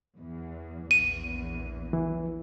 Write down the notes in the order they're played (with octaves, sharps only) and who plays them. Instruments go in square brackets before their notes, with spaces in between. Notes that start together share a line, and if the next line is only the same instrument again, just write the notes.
[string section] E2
[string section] A#1 E2 [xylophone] D#7
[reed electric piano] E3